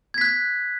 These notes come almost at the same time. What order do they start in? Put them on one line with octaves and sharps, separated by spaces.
G#6 B6 F#6